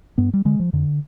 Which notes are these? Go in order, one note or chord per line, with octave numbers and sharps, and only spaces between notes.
G2 B3
G3
D3 G#3
F3
F2 D3